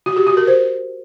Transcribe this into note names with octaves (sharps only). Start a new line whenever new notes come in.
F#4
G4
F#4
A#4
C5